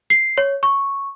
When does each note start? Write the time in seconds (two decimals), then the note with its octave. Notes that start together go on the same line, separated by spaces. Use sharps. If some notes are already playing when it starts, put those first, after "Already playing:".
0.10 C7
0.38 C#5
0.63 C#6